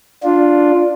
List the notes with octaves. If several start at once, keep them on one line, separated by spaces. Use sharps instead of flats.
D4 F4